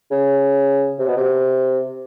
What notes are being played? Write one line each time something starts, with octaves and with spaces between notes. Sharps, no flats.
C#3
C3
B2
C3